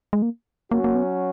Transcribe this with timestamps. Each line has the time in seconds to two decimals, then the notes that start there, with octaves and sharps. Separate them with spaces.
0.13 G#3
0.22 A#3
0.71 F#3 A#3 C#4 F#4
0.84 A#3
0.95 B3